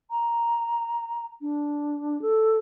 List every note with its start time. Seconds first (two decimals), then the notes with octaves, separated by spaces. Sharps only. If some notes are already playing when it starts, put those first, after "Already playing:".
0.11 A#5
1.41 D4
2.22 A4